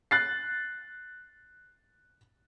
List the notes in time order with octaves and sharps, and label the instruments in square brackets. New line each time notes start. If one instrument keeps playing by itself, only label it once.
[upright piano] F#6 A6 C7